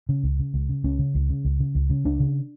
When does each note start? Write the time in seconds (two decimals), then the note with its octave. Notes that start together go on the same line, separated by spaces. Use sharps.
0.09 C#3
0.23 C#2
0.39 C#3
0.54 C#2
0.69 C#3
0.84 C#2 C#4
0.99 C#3
1.15 C#2
1.29 C#3
1.45 C#2
1.60 C#3
1.75 C#2
1.90 C#3
2.05 C#2 D4
2.20 C#3